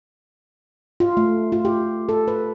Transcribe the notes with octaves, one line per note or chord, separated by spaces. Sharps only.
F4
A3
F4
G4
A4
B4